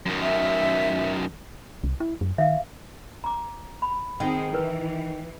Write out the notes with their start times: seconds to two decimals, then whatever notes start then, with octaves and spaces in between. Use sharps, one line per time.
0.06 F#2 D#3
0.22 E5
1.84 C2
2.00 E4
2.21 F#2
2.38 D#3 E5 F5
3.24 A#5 D6
3.82 B5
4.20 D#3 C4 D#4 G#4 F#5
4.53 E3 E4 A#4 B4